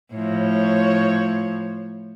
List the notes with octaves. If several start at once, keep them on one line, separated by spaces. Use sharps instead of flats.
A2 F3 C#5